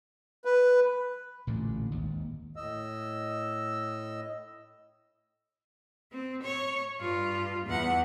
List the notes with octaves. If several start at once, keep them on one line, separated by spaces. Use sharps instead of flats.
B4
A1 A#2 D3
G#1 D#2
A2 D#5 E6
C4
C#5
G2 F4
E2 F#5